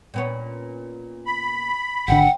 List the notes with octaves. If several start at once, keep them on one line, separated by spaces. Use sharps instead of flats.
A#2 B3 C#4
B5
G#1 D3 C4 F#5